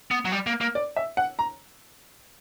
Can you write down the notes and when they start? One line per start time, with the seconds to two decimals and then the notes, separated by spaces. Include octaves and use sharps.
0.11 B3
0.25 F#3
0.32 G3
0.47 A#3
0.61 A#3
0.75 D5
0.96 E5
1.17 F#5
1.39 A#5